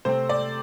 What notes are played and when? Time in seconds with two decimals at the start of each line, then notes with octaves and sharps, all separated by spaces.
0.05 C3 A3 C4 C5
0.29 D5